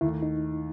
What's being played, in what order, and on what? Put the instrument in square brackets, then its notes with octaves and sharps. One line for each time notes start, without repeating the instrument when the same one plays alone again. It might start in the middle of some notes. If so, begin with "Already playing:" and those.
[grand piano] D#2 D#3 A3 [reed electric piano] E4
[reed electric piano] D#4